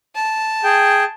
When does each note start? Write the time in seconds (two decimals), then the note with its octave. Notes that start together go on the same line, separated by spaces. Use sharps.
0.15 A5
0.64 G#4 G5